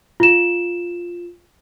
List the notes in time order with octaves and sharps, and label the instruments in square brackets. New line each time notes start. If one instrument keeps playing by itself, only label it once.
[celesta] F4 E7